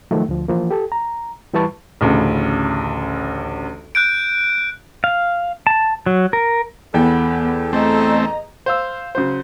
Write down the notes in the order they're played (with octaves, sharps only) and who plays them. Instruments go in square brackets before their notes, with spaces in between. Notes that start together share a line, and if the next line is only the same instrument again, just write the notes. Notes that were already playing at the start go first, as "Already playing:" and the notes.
[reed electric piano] D#3 F3 F#3 A3
D2 F3
E3 F3 A#3
G4 A4
A#5
E3 G3 E4 B4 A5 C#6
[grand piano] A1 D2 C#3
[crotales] F#6 G6 D7
[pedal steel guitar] F5
A5
F#3
A#4
[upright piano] E2 G5 [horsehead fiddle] B3 [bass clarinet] A4
[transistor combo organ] A3 C4 [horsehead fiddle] D#5 A#5
[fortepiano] C5 F5 E6
C#3 F#3 C5